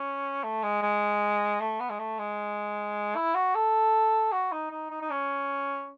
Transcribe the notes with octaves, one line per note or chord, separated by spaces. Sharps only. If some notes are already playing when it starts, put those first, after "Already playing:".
Already playing: C#4
A3
G#3
G#3
A3
B3
G#3
A3
G#3
E4
F#4
A4
F#4
D#4
D#4
D#4
D#4
C#4